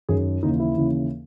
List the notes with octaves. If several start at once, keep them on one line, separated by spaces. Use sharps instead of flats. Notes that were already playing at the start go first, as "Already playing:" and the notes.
F#2 D#3 G#4
D#2 C#3 E3 D#4
E4
D#2 C#3 E3